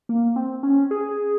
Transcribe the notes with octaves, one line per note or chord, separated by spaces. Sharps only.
A#3
C4
C#4
G#4